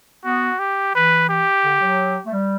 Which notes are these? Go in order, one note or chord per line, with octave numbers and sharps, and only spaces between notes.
B3 F#4
G4
E3 B4
G4
D3
F#3
A3
G3